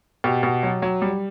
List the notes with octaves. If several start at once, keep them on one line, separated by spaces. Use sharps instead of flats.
B2 G4
B2
F#3
F#3
G3